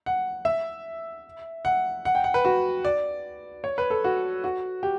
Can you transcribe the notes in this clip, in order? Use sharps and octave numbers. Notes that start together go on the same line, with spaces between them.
F#5
E5
F#5
F#5
G5
F#5
B4
F#4
D5
C#5
B4
A4
F#4
F#4
G4